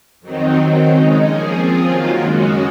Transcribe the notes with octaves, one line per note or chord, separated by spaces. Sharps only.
F2 D#3 F#3 C4 D#4
D#3 F#3 C4
C#3 G#3 D#4
F3 A#3 C#4 G#4
F3 C4 F4 G#4
D#3 F#3 A#3 F4
F#2 C#3 G#3 C#4 F#4